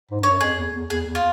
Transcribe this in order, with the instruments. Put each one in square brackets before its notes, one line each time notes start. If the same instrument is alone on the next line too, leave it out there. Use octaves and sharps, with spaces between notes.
[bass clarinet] G#2
[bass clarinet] G2 [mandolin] C#5
[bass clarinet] F#2
[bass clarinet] F2 [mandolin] G#4
[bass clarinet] E2
E2
[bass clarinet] E2 [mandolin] G#4
[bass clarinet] E2
[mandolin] F4